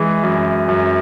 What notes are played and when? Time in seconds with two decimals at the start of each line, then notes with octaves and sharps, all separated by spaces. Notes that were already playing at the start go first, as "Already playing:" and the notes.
Already playing: E3 G#3
0.23 F#2
0.69 F#2